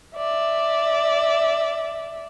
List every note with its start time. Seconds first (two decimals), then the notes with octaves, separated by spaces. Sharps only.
0.17 D5 E5